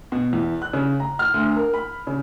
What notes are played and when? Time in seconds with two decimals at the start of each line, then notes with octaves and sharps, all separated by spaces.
0.12 B2
0.33 E2
0.62 F#6
0.73 C#3
1.00 A#5
1.19 F6
1.34 D2
1.56 A#4
1.74 B5
2.07 C#3